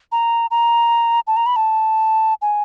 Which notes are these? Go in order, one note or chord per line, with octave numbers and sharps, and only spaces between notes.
A#5
A#5
A5
A#5
B5
A5
G#5